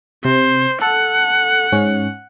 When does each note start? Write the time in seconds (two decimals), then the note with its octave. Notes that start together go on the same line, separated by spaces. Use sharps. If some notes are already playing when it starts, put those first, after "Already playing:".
0.25 C3 C5
0.82 A4 F#5
1.72 G#2 C#4